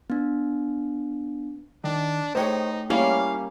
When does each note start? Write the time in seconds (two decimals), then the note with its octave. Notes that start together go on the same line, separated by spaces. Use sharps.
0.10 B3 D4
1.84 D#3 D4
2.35 A2 D#4 G4 G#4 C5 C#5
2.90 G3 A#3 C#4 E4 C#5 F5